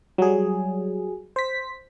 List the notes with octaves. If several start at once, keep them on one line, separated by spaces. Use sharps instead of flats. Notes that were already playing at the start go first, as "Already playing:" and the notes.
F#3 G3 G#4
C5 B6